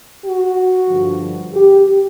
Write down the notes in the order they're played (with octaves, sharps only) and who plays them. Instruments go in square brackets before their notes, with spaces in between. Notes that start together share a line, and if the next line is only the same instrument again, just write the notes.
[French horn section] F#4
G2 D3 F3
G4